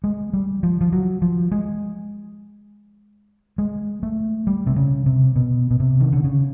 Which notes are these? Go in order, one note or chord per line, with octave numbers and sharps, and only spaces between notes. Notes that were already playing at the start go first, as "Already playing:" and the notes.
G#3
G3
F3
F3
F#3
F3
G#3
G#3
A3
G3
C3
C#3
C3
B2
B2
C3
D#3
D3
C#3